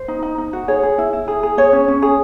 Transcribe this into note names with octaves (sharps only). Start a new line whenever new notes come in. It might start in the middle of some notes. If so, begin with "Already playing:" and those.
Already playing: C5
D#4
D#4
D#4
F#4
G#4 C#5
G#4
E4
E4
G#4
G#4
G#4 C#5
C#4
C#4
G#4